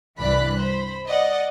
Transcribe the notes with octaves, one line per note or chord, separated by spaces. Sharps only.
C2 G2 E3 D5 B5 F#6
C5 B5
D5 D#5 F#5